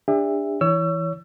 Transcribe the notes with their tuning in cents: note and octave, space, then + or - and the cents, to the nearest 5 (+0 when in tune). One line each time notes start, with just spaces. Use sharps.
D4 +0 G4 +45 E5 +0
E3 +0 C#5 +20 E6 +30